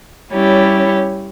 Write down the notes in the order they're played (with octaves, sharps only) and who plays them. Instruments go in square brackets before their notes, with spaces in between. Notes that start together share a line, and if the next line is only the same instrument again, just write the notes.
[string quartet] G3 C#4 E4 G4 C#5